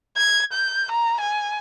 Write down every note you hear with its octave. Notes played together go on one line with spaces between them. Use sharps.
G#6
G6
A#5
G#5